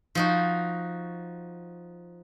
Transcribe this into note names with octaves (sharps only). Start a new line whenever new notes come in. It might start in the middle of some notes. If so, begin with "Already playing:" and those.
F3 D#4 F#4